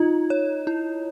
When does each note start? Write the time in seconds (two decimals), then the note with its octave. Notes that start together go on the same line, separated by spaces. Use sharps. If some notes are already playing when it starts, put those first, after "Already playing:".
Already playing: D#4 F4
0.30 C#5
0.67 E4